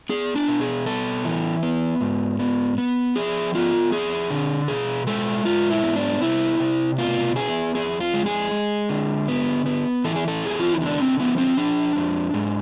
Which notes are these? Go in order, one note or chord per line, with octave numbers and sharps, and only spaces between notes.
B3 G#4
D4
B2
G#4
B3 A4
E3
B3
G#2
B3
B3
F3 G#4
B3 F4
F2 G#4
D3
B2 G#4
G#3 A4
G#2 F4
E4
B3
D4
C3 E4
C3
B2 F4
B3 G#4
F2 G#4
F4
G#3
G#4
G#3
D3
B3
B3
E3 A4
G#4
A4
E2 G#4
F4
E4
D3
D4
C4
F3 B3
C4
F3 D4
F2
G#2